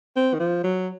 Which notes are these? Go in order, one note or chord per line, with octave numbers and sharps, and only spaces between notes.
C4
D#3
F3
F#3